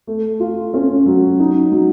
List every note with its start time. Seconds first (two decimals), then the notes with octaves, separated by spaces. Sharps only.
0.07 A3
0.40 F4
0.74 C#4
1.06 F#3
1.39 D#4
1.72 F#3